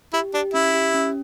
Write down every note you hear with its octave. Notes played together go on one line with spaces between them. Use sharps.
E4 G4
D4 G4
C#4 E4
G4
C#4